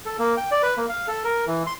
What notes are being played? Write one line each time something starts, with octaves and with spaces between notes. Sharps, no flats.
A4
A#3
G5
D5
B4
A#3
F5
A4
A#4
E3
C6